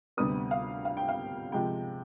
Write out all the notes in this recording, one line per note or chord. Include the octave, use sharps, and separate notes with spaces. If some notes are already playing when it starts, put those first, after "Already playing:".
D2 C3 G3 B3 D#6
F5
F5
G5
F5
C3 F3 G#3 G5